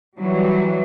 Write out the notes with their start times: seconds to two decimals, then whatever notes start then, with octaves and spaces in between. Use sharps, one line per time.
0.18 E3 F#3 G3